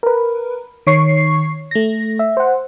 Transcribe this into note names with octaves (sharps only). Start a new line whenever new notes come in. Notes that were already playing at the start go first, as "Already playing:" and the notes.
A#4 B4
D#3 C#5 C#6 C7
A3 A#6
E5
C5 F#5